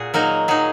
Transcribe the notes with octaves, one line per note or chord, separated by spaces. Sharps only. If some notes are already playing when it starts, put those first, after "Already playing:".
Already playing: A#2 F#4 G#4
F#3 A#3 D#4
F#3 D#4 G#4